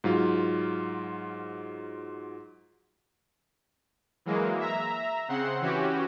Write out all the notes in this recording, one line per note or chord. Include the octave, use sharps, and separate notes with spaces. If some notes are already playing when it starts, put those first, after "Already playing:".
G#2 F#3 F4
E3 F#3 G#3 A#3
E5 A#5
C#3 C4 F#5 C6
E3 C#4 F#4 G4